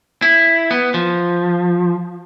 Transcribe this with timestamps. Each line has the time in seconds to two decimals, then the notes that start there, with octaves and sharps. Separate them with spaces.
0.22 E4
0.71 B3
0.94 F3